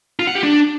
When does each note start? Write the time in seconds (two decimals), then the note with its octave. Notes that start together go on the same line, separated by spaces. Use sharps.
0.19 F4
0.27 F#5
0.35 G4
0.43 D4